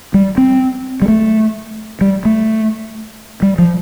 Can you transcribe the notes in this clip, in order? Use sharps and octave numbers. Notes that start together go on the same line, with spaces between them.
G3
C4
G3
A3
G3
A3
G3
F3